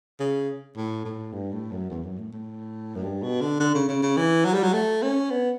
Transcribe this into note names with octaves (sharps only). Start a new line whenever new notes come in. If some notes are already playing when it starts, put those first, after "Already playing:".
C#3
A2
A2
G2
A2
F#2
E2
F#2
A2
A2
F#2
G2
B2
D3
D3
C#3
C#3
C#3
E3
F#3
G3
F#3
A3
C#4
B3